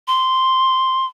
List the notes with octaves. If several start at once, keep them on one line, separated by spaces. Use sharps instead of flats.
C6